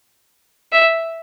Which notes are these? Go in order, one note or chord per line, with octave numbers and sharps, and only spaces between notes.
E5